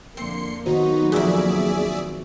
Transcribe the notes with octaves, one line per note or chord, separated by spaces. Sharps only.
F2 D3 A#3 C4 C6 C7 C#7
D#3 F#3 A#3 B3 D#4 F#4 C5
F2 A#2 G#4 D5 E5